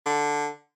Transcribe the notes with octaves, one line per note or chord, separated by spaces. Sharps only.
D3